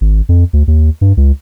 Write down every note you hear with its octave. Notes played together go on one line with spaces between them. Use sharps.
G#1
F2
D2
D#2
G2
C#2